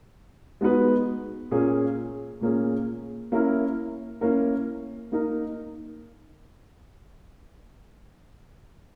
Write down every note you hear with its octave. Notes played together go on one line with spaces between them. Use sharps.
G#3 B3 D#4 F#4 B4
A#2 A#3 C#4 G#4
A#2 A#3 C#4 G#4
A#3 C#4 E4 A#4
A#3 C#4 E4 A#4
A#3 D#4 A#4